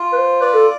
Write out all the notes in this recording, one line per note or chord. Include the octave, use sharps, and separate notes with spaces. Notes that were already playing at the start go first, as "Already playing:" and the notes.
Already playing: F4
B4
C5
B4 D5
A4